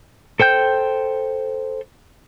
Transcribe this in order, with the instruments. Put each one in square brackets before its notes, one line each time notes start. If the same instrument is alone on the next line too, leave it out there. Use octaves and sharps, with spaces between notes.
[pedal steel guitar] A4 C5 G5 G6